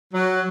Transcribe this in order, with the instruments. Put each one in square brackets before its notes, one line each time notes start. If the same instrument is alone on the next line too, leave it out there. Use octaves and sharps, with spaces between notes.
[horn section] F#3